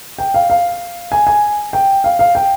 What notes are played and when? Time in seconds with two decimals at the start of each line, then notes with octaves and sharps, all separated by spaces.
0.18 G5
0.34 F5
0.50 F5
1.12 G#5
1.27 G#5
1.73 G5
2.04 F5
2.19 F5
2.35 G5